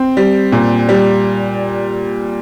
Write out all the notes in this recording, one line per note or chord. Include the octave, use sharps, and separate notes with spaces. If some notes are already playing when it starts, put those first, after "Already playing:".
Already playing: C4
G3
A#2
G3